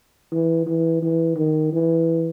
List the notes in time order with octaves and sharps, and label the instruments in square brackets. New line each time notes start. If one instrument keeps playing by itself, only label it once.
[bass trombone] E3
E3
E3
D#3
E3